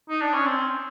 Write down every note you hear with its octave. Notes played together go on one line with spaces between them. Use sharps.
D#4
D4
C#4
C4